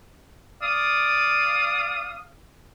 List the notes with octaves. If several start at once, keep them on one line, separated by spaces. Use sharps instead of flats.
D5 F5 D#6